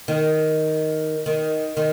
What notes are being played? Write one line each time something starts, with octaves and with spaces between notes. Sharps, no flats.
D#3
D#3
D#3